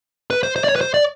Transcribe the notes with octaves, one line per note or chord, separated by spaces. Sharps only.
B4
C5
C5
D5
C#5
B4
C5
D5